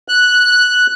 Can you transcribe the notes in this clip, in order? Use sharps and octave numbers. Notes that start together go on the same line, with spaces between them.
F#6